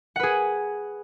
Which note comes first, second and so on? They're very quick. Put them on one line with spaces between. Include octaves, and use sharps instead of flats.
F#5 B4 G#4